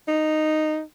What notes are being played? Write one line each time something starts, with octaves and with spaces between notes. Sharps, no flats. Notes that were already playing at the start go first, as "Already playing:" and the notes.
D#4